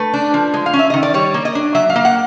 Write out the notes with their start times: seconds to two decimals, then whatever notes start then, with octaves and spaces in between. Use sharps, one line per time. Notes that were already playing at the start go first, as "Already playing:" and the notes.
Already playing: A3 B4
0.14 D4
0.34 F3
0.54 G#3
0.66 F5
0.73 C#4
0.79 E5
0.90 D#3 D#5
1.03 D5
1.14 G3 C#5
1.34 A#3
1.45 D#5
1.55 D4
1.75 F#3 E5
1.90 F5
1.96 A#3
2.05 F#5